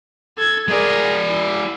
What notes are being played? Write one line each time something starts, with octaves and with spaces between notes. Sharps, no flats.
A4 G#6
G#3 G#4 A#4 D5
E4